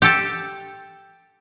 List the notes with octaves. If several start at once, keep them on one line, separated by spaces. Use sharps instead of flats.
G4 A4 A5